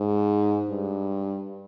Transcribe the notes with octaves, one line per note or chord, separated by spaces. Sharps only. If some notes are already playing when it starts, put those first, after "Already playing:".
Already playing: G#2
G2